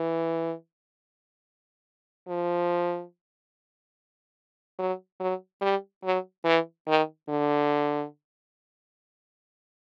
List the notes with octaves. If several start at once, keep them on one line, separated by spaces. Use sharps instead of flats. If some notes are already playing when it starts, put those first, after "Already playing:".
Already playing: E3
F3
F#3
F#3
G3
F#3
E3
D#3
D3